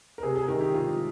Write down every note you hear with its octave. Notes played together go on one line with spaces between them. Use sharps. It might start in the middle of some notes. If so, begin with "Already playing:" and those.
A#4
C3 G#4
G#4
D#3 A#4
G4
C3 F4